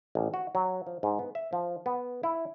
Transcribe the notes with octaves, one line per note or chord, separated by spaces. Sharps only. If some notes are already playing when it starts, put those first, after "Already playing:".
A1
F#4
F#3
F3
G#2
B3
E5
F3
B3
E4